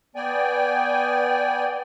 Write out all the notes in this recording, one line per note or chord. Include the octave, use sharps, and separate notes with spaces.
B3 D5 G5 G#5